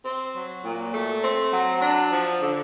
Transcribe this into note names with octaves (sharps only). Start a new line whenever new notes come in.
C4
F#3
A#2
A3
C4
F#3
D4
F3
D3